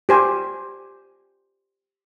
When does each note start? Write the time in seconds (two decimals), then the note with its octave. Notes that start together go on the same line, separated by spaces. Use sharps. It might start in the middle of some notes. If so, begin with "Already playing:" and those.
0.09 G4 C5 G#5